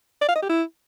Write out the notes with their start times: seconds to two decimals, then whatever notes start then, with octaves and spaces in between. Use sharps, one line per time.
0.22 D5
0.29 F5
0.35 D#5
0.42 G4
0.49 E4